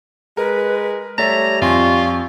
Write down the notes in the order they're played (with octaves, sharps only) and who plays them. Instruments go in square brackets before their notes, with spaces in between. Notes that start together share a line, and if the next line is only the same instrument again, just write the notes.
[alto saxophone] G#3 [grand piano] A#4 [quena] B4
[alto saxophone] G3 [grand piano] A3 E5 A6 [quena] C#5 [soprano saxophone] A#5
[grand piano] F2 G#5 C6 [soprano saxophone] F4 [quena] C#6